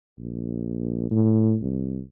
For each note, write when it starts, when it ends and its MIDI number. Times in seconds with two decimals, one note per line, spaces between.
0.19 1.07 34
1.11 1.56 45
1.62 2.01 36